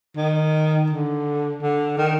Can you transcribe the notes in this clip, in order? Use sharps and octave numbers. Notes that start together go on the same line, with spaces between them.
D#3
D3
D3
D#3